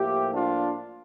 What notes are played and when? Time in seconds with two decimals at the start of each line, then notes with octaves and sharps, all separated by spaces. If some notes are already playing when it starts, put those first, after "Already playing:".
Already playing: A2 F3 A#3 E4 G4
0.33 D4 F4